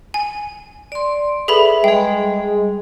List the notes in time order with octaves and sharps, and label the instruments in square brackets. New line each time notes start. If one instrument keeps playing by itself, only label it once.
[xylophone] G#5
[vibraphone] D5 C6
[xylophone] G#4 A4 B5 [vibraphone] B4 E5
[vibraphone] G3 G#4 [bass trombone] G#3 [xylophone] G5